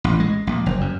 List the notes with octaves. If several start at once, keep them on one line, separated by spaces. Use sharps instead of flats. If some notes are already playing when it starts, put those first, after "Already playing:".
A1
G#3
A#1
F#1
F#2